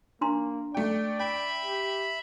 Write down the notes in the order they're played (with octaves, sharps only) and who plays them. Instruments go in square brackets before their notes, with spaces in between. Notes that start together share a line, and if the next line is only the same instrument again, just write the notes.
[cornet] A#3 [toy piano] D4 A#5 C6
[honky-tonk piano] A3 G5 [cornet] D5
[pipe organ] E5 B5 [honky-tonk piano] G5
[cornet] G4